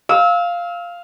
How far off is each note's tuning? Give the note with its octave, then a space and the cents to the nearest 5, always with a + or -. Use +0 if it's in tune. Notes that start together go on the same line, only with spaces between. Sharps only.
F5 +0 E6 -30